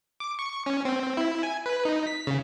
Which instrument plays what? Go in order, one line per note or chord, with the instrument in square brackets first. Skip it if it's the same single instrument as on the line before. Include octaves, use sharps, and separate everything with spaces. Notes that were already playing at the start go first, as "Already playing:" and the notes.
[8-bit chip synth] D6
C#6
C#4
C4
E4
G#5
B4
D#4
B6
C#3